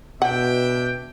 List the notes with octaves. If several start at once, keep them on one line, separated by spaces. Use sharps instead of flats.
B2 D4 E5 F#5 G5